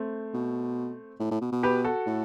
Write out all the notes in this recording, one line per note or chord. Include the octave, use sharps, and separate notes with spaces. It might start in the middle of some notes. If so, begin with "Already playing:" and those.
Already playing: A3 C4
B2
A2
A2
B2
B2
G4 B4
F#4 A4
A2